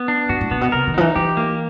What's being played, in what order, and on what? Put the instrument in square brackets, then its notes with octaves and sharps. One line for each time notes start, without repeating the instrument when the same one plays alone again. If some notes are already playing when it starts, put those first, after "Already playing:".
Already playing: [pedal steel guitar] B3
D4
[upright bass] A2 [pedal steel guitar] F#4
[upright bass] A2
[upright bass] A#2 [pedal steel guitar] B3
[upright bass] B2
[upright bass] C3 [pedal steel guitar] A#4
[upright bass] D#3
[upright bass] F3 [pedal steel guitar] D#4
[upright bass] E3
[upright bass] E3 [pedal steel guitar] G4
[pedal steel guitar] A#3